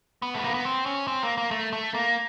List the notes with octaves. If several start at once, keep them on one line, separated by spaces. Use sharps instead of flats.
B3
A3
A#3
B3
C4
C#4
C4
A#3
A#3
A3
A3
A#3